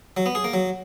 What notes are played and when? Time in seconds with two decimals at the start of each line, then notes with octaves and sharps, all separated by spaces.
0.17 F#3
0.26 B3
0.35 G#4
0.44 A#3
0.54 F#3